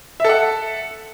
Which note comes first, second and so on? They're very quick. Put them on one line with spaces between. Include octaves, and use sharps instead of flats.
E5 A4 F#5